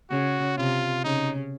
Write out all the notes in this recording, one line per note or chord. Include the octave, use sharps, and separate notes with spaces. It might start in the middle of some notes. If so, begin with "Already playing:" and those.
C#3 F#4
C3 F4
C#3 D#4